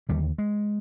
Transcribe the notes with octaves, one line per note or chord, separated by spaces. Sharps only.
D#2 D3 G3
G#3